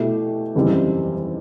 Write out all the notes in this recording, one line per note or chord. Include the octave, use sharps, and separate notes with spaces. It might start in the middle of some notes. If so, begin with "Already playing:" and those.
Already playing: B2 A3 E4 G4
F#1 E2 D#3 G3 C4